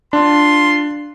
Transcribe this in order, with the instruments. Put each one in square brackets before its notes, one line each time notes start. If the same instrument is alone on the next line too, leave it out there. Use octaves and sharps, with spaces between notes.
[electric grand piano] D4 [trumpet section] F4 C6